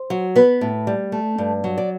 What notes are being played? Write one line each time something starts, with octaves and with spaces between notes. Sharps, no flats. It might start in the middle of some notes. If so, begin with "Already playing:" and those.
Already playing: C5
F#3
B3 B4
A2
G3
A3
G2
F#3
D5